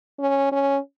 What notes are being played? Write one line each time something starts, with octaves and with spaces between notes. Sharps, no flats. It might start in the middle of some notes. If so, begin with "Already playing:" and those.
C#4
C#4